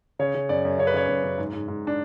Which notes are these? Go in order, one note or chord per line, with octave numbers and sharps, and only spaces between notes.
C#3 C#5
C#3
F#2 D5
F#2
C#3 C#5
B4
C#3 C#5
F#2
F#2
G#2
G#2
G#2
D4